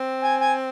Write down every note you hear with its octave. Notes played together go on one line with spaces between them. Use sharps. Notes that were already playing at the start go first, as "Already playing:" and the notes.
Already playing: C4
G#5
G#5